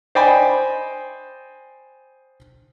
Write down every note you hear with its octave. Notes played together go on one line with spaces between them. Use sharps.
C5 D5 D#5 G5 G#5 B5